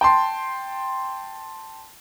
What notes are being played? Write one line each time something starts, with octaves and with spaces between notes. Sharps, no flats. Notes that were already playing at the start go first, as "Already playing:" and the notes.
G5 A5 C6